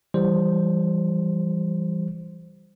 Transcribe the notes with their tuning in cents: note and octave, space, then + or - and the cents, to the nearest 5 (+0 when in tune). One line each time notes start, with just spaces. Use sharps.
E3 +25 G3 +0 C5 +0